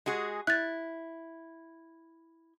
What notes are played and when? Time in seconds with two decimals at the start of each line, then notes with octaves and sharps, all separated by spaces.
0.06 G#3 F#4 G#4
0.47 E4 F#6 A6